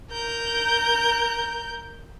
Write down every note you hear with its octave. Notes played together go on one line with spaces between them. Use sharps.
A#4 G6